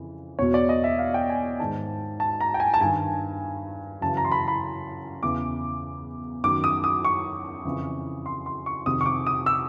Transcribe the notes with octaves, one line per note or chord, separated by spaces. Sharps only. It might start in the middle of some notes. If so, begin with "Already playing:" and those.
Already playing: F2 C#3 E3
E2 B2 C#5
D5
D#5
E5
F5
G5
G#5
G#2 D#3 A5
A5
A#5
G5
G#5
A5
G2 D#3 G#5
F#2 C#3 E3 A5
A#5
C6
B5
B5
E2 C#3 E3 D6
F#2 D#3 D6
D#6
D#6
C#6
F2 C#3 E3
C6
C6
C#6
F2 C3 D#3 D#6
C#6
D6
D#6
E6